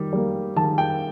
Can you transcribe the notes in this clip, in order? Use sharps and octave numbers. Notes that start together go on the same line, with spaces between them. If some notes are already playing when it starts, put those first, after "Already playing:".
Already playing: D#3 G3
G3 A#3
D#3 A5
G5